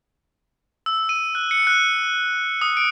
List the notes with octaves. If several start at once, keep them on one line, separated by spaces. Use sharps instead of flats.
E6
D#7
F#6
C#7
F#6
D#6
D7